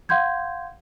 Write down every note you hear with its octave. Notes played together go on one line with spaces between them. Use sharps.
F5 F#5 C6 G6 G#6